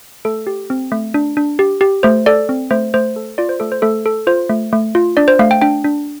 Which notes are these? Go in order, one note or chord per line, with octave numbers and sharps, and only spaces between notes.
A3 A4
G4
C4
A3
D4
D4
G4
G4
A3 C5
A4 D5
C4
A3 C5
A3 C5
A4
F4 D5
C5
A3 A4
C5
A3 A4
A4
F4 C5
A3
A3
F4
D4 D5
C5
A3 F5
G5
D4 G5
D4